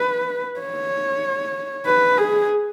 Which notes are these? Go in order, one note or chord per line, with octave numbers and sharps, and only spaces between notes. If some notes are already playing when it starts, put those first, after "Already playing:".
Already playing: B4
C#5
B4
G#4